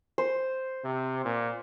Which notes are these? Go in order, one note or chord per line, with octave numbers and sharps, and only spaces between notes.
C5
C3
A#2